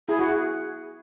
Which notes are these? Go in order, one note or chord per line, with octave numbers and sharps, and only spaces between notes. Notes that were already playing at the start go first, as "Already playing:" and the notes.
E4 G#4
F#4